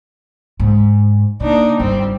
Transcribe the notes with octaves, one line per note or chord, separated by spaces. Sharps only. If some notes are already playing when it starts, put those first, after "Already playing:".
G#2
B2 A#3 D4 D#4
G1 G3 C4